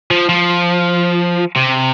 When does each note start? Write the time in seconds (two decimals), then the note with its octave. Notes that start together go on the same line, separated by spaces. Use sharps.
0.11 F3
0.29 F3
1.56 C3